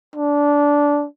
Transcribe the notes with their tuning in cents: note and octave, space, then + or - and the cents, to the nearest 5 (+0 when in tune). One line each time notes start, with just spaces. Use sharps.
D4 -15